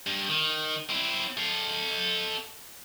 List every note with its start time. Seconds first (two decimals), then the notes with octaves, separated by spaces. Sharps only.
0.07 G2
0.29 D#3
0.89 C4 E4
1.38 A4 F5